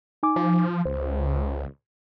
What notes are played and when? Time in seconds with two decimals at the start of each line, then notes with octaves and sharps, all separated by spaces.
0.23 D#4 G#5 D6
0.36 F3
0.85 C#2 C5